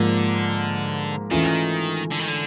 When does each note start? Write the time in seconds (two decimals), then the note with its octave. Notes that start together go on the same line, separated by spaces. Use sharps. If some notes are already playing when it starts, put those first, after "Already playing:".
Already playing: G#2 D3 F3 A#3
1.31 D#3 E3 A3 C#4 F4
2.11 D3
2.19 D#3
2.28 D3